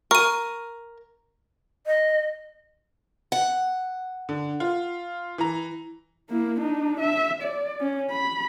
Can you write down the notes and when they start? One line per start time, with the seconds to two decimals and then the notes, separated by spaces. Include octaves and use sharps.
0.11 A#4 C#6 D#7
1.86 D#5
3.32 F#5
4.29 D3
4.60 F4
5.38 E3 A#5
6.30 A#3 E4
6.60 D4 D#4
7.00 E5
7.42 D5
7.81 C#4
8.11 B5